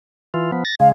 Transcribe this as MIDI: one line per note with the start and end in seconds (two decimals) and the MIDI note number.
0.34 0.51 52
0.34 0.51 65
0.52 0.64 53
0.52 0.64 59
0.65 0.75 93
0.65 0.75 94
0.80 0.92 49
0.80 0.92 56
0.80 0.88 77